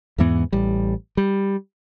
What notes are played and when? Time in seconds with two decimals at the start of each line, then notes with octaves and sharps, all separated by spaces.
0.18 E2 G#2 E3 B3
0.53 A1 G3
1.17 G3